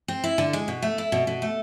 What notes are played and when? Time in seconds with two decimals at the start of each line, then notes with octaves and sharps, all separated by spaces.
0.08 C4
0.24 E4
0.38 D3
0.53 G#3
0.68 B2
0.82 A3
0.98 E4
1.12 B2
1.27 B2
1.42 A3